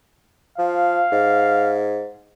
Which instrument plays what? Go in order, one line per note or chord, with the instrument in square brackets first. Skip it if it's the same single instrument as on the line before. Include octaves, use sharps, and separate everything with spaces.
[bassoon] F3 [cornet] F5
[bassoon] G#2